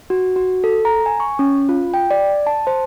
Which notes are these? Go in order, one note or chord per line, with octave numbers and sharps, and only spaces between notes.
F#4
F#4
A4
A#5
G#5
C#6
C#4
F4
G5
D5
A5
C5